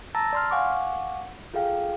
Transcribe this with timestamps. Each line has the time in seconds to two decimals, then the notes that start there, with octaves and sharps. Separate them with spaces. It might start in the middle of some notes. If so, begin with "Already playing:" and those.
0.15 A5 A#5 E6 A6 A#6
0.33 D5 C6 F6
0.51 F5 F#5 G#5 C#6 D6
1.54 F4 G#4 A4 F5 G5